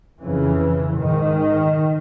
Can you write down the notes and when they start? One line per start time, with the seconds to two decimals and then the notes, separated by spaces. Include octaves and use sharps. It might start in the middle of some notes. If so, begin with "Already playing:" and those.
0.21 F2 C#3 E3
0.97 G#2 D#3